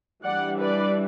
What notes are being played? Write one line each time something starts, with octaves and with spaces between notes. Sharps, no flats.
E3 G3 D4 D5 F#5
B4 D5